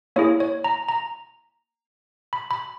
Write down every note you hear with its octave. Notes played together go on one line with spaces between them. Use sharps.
A#3 E4 G#4 C#5
C#5
A#5
A#5
B5
B5